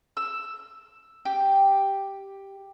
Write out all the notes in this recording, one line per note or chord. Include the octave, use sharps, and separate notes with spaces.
E6
G4